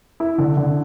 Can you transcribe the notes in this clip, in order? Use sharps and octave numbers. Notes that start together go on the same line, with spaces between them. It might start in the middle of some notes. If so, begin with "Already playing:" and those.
E4
D3
D3